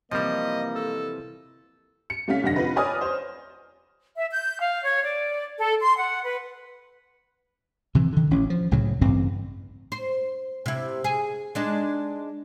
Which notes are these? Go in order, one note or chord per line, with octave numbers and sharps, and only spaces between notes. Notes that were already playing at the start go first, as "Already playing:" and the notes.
C3 E3 F3 G3 A#3 D#5
A4
C#7
C2 A3 C#4 F5 B6
F1 C2 D3 F#5 A#6
F4 B4
B4 C#5 D5 G#5 D#6 F6
C5 C#5
E5
G6
F5
C#5
D5
A4
C6
F#5
B4
C3 E3
D3 D#3
A1 C#4
F3
C2 A2 C#3 F#3
A1 G2 C#3 C4
C5
C3 E4
G#4
G#3 D4 D#4